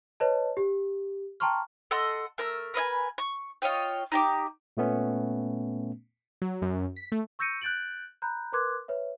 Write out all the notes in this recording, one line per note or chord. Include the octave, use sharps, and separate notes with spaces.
B4 C#5 D#5 A5
G4
G5 A5 A#5 C6 C#6 F6
A4 D#5 F#5 C6
A3 A#4 E6
A#4 B4 E5 G#5
C#6
F4 C#5 D#5 G5
D#4 G4 D6
A#2 A3 B3 C#4
F#3
F#2
B6
A3
C#6 E6 G6 A#6 C#7 D#7
F#6 G6 A6 D7 F#7
A#5 B5 F#6 G6
A#4 B4 C6 D6 F#6 G#6
B4 C#5 E5